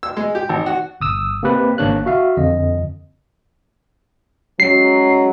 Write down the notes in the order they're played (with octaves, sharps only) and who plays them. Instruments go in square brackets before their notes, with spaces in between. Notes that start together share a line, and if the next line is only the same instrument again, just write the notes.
[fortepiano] E6
G#3
G4
G#1
F#4
[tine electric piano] G1 D#6 E6
A#3 C4 G4 B4
G#1 A#3 D4 C#5 F#6
F#4 E5 F5
F2 D3 D#5
[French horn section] F#3 G#3 C#4 [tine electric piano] C7